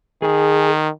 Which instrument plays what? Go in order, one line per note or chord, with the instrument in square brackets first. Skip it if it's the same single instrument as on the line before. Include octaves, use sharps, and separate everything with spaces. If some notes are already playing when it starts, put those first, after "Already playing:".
[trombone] D#3 [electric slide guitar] G#4